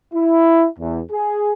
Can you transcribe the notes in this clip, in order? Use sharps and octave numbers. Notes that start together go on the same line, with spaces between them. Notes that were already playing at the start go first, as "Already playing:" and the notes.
E4
E2
G#4